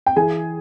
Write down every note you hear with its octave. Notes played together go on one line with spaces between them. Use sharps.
G5
E3 G#4 G#5